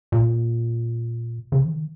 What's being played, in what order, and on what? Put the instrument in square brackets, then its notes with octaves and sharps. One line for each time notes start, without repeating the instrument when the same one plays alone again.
[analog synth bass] A#2
C#3
E3
D#3